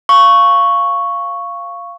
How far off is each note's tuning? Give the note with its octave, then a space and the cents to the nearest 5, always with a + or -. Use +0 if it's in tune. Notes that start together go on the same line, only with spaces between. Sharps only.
F5 -10 C#6 +0